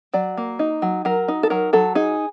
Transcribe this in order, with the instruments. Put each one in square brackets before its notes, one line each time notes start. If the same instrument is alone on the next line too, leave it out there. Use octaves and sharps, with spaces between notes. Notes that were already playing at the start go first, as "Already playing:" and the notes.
[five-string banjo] F#3 D5
A#3
D#4
F#3
F#3 A#4
D#4
A4
F#3 A#4
F#3 A4
D#4 G#4